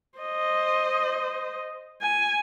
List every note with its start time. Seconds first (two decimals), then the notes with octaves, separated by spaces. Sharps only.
0.19 C5 D#5
2.02 G#5